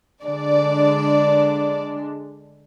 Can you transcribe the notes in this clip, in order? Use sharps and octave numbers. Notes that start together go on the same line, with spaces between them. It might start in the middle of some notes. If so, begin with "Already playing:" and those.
D3 G#3 D4 D5